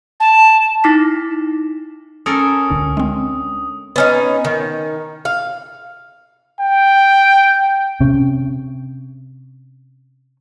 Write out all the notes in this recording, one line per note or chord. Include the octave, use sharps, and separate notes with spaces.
A5
D#4 E4 D6 A#6 B6
C#4 A4 A#4 D#6
C#2 D3 D4
G#3 C4 D4
B3 C#4 D#4
D#3
F5
G5
C3 C#4